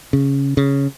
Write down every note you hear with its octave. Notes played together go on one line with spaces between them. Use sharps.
C#3
C#3